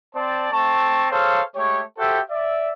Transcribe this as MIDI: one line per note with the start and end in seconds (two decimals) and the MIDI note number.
0.15 0.49 60
0.15 0.49 72
0.15 0.49 74
0.15 0.49 81
0.52 1.07 57
0.52 1.07 60
0.52 1.07 81
0.52 1.07 85
1.11 1.41 68
1.11 1.41 69
1.11 1.41 72
1.11 1.41 73
1.11 1.41 77
1.55 1.81 56
1.55 1.81 57
1.55 1.81 67
1.55 1.81 73
1.98 2.19 66
1.98 2.19 67
1.98 2.19 69
1.98 2.19 72
1.98 2.19 76
1.98 2.19 79
2.30 2.71 74
2.30 2.71 76